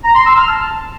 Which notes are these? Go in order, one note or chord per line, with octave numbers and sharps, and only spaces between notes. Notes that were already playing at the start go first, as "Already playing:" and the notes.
A#5
C6
E6
F6
A5